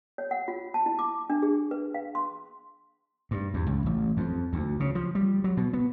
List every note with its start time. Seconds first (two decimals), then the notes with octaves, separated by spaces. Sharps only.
0.18 C#5
0.31 F#5
0.48 F4
0.74 A5
0.86 E4
0.99 D6
1.30 D4
1.42 G#4
1.71 B4
1.94 F5
2.15 C6
3.31 G2
3.54 E2
3.67 C#2
3.86 A1
4.17 F2
4.53 D2
4.80 C#3
4.95 F3
5.15 G3
5.44 F#3
5.57 B2
5.73 B3